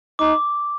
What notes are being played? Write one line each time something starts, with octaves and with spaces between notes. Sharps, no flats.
D#4 D6